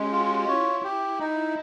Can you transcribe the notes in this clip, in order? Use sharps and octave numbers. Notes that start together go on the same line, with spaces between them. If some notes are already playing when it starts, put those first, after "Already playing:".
Already playing: G#3 C#4 G4
F4 F#4
E4 C#5
G4
D#4